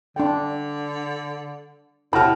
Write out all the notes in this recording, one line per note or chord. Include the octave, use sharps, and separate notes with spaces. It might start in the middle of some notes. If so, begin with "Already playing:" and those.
D3 D4 G5
A2 C3 F#4 A5 B5 F6